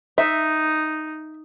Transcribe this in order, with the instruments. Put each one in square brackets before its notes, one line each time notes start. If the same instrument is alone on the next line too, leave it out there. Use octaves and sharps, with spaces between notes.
[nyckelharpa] D#4 [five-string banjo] E5